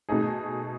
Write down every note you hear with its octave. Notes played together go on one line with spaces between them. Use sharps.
B2 A3 D#4 G#4